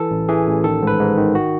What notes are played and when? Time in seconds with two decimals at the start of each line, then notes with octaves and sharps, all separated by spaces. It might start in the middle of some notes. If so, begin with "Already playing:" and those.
Already playing: E3 A4
0.11 A1
0.29 E3 G#4
0.47 A1
0.64 D#3 A4
0.82 G#2
0.87 B4
0.99 G#2
1.18 D#3
1.35 F#4